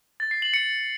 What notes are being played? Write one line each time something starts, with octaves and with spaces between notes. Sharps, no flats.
A6
C7
F#7
C#7